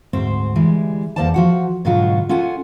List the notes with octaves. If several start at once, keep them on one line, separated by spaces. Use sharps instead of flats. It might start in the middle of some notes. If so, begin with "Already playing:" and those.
D2 G#2 C4 C5
E3 G3 G#3
E2 A#3 A4 C5 D5 A5
F3 F#4 F#5
G#2 B2 D3 F#3 F4 F#4
C#4 F4 A4 F#5 G#5